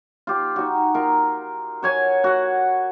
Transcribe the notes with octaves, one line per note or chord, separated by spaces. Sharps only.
F4 G4
D#4 F#4
F4 A#4
F#4 C#5 G#5
F#4 F#5